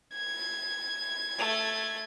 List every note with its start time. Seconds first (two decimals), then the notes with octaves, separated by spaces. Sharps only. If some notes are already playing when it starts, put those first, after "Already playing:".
0.18 G#6
1.38 A3